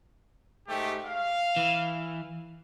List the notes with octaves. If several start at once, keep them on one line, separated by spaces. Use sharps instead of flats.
G#2 A3 G4
F5
E3